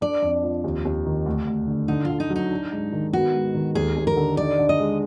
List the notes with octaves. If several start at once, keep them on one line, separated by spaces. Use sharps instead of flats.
D4 D5
F2
F3
D#2
D#2
D#3
D2
D2
D3
D3 D#4
D3 F4
D#4
F#3
D#4
D4
G#2
D#3
B3 F#4
G#2
D#3
D#2 G#4
D#2
A#4
D3
D#4 D5
D3
D#5
G#3